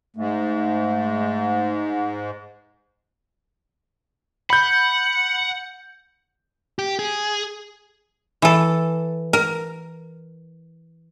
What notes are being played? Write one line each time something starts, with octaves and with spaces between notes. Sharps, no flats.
G#2 A3
F#5 B5 G6
G4
G#4
E3 A4
A#4